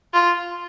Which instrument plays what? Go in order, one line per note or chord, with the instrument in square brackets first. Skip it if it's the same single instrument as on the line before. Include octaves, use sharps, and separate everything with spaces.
[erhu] F4